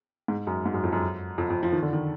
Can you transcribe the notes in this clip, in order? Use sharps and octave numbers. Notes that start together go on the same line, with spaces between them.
G#2
F#2
G#2
F#2
F2
F#2
F2
F2
F3
D#3
D3
D#3